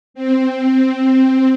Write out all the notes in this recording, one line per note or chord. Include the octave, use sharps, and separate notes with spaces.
C4